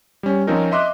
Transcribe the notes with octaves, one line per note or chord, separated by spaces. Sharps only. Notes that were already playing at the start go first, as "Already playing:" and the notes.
G3 C#4
F3 C4 C#4 D#4 A#4
D#5 E5 C6 D6 F#6